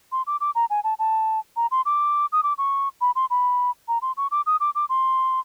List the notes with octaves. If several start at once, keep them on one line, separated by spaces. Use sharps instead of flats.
C6
D6
D6
A#5
G#5
A5
A5
A#5
C6
D6
D#6
D6
C#6
B5
C6
B5
A#5
C6
C#6
D6
D#6
D6
D6
C6